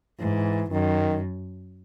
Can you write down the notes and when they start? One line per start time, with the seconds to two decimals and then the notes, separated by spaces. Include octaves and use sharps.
0.19 G#2 E3
0.71 F#2 D#3